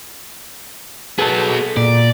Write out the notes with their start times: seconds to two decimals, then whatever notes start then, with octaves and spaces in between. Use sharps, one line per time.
1.19 F#3 B3 G#4 A4
1.77 A#2 D5